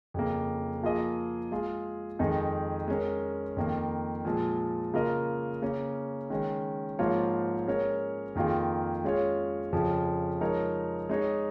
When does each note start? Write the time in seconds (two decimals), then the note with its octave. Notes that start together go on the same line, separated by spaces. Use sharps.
0.14 F2 C#3 A#3
0.83 F3 A#3 F4 G#4 D#5
1.52 G#3 F4 G#4
2.19 F2 D#3 G#3 D#4 G#4
2.88 G#3 C#4 A#4
3.57 F2 D#3 A#3
4.25 A#2 F3 G#3
4.94 C#3 A#3 F4 A#4 D#5
5.62 C#3 A#3 C#4
6.30 D#3 G#3 C#4
6.99 G#2 F3 A#3 F4 C#5
7.67 G#3 C#4 A#4 C#5
8.35 F2 D#3 A#3 F4 G#4
9.04 G#3 C#4 F4 G#4 C#5
9.72 F2 C#3 F3 C#4
10.41 F3 G#3 D#4 A#4 C#5
11.09 G#3 D#4 C#5